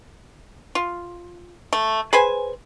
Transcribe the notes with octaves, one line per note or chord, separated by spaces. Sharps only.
F4
A3
G#4 B4 C5 G#5